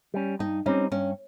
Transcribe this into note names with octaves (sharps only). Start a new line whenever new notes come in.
G3 C#4
G2 D#4
G3 C4 C#4 D#4
G2 C#4